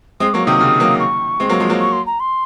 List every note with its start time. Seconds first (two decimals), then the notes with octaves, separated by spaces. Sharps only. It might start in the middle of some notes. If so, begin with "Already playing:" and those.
0.20 G#3 C4 D#6
0.34 F#3 A#3 C#6
0.46 C3 D#3 D#6
0.61 C#3
0.80 F#3 A#3
1.00 C#6
1.40 G#3 C4
1.49 F#3 A#3
1.60 F3 G#3
1.70 F#3 A#3
1.80 C#6
1.93 C6
2.06 A#5
2.20 C6